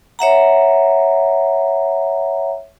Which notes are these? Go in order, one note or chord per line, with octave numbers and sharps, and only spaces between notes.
C#5 E5 F#5 A#5